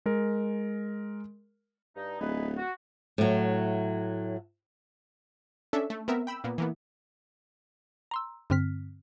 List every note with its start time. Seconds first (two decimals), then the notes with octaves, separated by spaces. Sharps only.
0.06 G#3 A#4
1.96 G2 D#4
2.20 D1 D#4 G#4 B4
2.57 F#4
3.18 A2 F#3
5.73 C#4 D4 A4 E5
5.90 A3
6.08 B3 C4 A#4 E5
6.27 G5 B5 E6
6.44 A#2 A#3 B3
6.58 E3 A#3 B3
8.11 A#5 C6 E6
8.50 G2 D3 C4 F6 B6